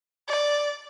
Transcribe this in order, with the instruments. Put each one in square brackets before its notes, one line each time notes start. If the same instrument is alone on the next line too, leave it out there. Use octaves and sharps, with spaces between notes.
[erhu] D5